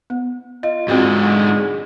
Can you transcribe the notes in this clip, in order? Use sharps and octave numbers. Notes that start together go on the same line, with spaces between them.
B3
F4 D#5
G#2 D3 G#3 C4 F4 F#4